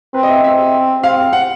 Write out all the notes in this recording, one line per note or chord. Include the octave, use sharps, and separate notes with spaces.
C4 B4
D#5
E5
C4 E5
C4 F5
F#5